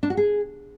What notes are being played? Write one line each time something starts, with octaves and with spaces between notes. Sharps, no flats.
D4
F#4
G#4